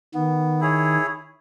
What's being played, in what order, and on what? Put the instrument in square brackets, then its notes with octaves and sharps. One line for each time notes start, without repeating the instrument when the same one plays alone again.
[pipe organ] D#3 [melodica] B3
[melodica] E4 G#4 C#5